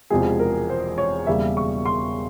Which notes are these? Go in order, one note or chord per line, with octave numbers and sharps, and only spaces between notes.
E1 E2 C3 F3 G#3 G#4
A#4
C5
C#5
E1 E2 C#3 G3 A#3 E5
C#6
C6